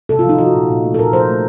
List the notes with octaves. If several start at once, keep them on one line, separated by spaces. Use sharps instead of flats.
C3 A4
F4
F3 D#4
F3 F#4
A#2
A#2
A3
A4
A#2 A#4
F3 C5
A3